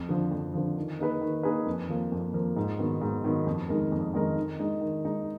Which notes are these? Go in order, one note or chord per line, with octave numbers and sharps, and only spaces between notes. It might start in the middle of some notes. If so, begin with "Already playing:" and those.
Already playing: F2
D3 F3
F2
D3 F3
D#3
A#3 D#4 G#4 B4
D#3
A#3 D#4 G#4 B4
F2
F3 A#3
F2
F3 A#3
G#2
D#3 F#3 B3
G#2
D#3 F#3 B3
F2
D#3 G#3 D#4 A#4
F2
D#3 G#3 D#4 A#4
D#3
G#3 D#4
D#3
G#3 D#4